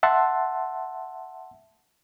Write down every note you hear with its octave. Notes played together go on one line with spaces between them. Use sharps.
E5 F#5 A5 C6